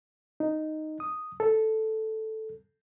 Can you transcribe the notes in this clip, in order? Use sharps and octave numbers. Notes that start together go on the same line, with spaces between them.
D#4
D#6
A4